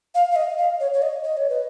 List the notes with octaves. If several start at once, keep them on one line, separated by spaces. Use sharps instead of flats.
F5
F5
D#5
F5
C#5
C#5
D#5
D#5
C#5
B4